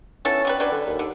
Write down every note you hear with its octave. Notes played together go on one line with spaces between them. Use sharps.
B3 C#4 E4 A4
D3 G3 B4
F#3 G3 D4 B4
D3
D#2
D3